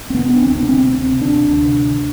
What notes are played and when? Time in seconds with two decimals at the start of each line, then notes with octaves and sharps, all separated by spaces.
0.10 C4
0.15 C3 B3
0.29 D4
0.42 D2 C4
0.55 D4
0.63 B3
0.68 C3 C4
0.95 D2
1.21 C3 D4
1.48 D2
1.74 C3